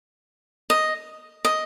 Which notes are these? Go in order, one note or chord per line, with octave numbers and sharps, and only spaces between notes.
D#5
D#5